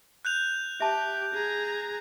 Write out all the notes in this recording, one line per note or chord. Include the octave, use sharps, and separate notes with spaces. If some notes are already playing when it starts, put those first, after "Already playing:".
F#6 G6 F7
G4 E5 A5
G#4 A#5